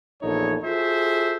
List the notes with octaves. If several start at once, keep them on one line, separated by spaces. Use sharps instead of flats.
A#1 E2 D#4 A4 C#5
F4 F#4 G#4 A4 C5 E5